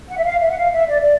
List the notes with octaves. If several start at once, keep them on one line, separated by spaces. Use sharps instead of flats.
F#5
E5
F5
E5
F#5
F5
E5
D5
D5